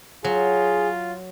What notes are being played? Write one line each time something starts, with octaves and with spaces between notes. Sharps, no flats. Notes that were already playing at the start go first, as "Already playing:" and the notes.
F#3 F4 G#4